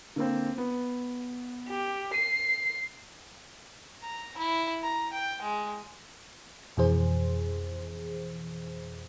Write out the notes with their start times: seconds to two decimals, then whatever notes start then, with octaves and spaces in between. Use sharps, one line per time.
0.16 D3 A#3 C4
0.58 B3
1.69 G4
2.14 C7 D#7
4.03 A#5
4.37 E4
4.83 A#5
5.13 G5
5.41 G#3
6.77 F2 B2 E3 G#4 C5